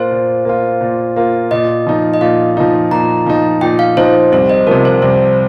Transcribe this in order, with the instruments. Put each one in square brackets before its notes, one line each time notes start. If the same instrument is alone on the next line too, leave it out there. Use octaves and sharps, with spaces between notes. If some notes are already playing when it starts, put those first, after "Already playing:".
Already playing: [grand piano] A#2 A#3 F4 [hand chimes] C5
[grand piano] A#2
A#3 F4
A#2
A#3 F4
[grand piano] A#2 [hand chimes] D#5
[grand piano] F3 D#4
[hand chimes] D#5
[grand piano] A#2 [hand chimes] F5
[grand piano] F3 D#4
[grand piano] A#2 [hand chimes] A#5
[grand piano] F3 D#4
[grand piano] A#2 [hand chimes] G5
[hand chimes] F5
[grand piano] F3 D#4 [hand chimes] C5
[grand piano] C2 [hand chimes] C5
[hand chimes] D#5
[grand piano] C3 F3 [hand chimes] A#4
[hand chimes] C5
[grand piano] C2 [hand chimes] C5